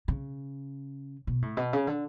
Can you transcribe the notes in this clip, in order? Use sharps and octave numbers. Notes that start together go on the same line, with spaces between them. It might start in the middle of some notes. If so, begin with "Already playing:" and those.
C#3
B2
A2
B2
C#3
D3